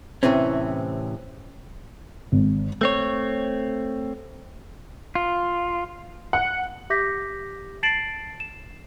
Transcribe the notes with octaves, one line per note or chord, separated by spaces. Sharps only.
A2 C3 E3 C4 C#4
G#1
A3 C4 C#5
F4
F#5
G4 E5 D6 G6 A#6 B6
A5 A6 C7 D7 E7 F#7
E7